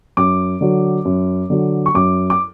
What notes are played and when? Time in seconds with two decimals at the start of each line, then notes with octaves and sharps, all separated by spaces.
0.17 F#2 D6
0.61 D3 F#3
1.05 F#2
1.50 D3 F#3
1.86 C#6
1.94 F#2 D6
2.30 D6